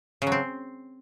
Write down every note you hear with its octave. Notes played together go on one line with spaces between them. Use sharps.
C#3
F#3
C4